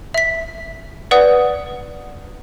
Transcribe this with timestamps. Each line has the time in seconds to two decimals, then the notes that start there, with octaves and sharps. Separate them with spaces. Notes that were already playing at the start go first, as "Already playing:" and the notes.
0.14 E5 B6
1.11 B4 D5 F#5 D#6